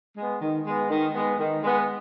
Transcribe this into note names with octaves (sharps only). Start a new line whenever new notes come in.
G#3 B3
D#3
G#3 B3
D#3
G#3 B3
D#3
G#3 B3